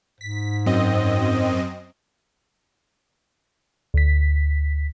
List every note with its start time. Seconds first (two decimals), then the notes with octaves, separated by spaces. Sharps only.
0.21 G#2 B6
0.66 F#2 C4 D#5
3.94 D2 B6